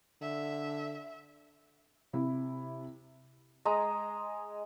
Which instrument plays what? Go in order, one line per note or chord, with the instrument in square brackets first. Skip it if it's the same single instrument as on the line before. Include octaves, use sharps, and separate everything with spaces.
[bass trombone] D3 [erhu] E5
[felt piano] C3 E4
[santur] G#3 A#5 D#6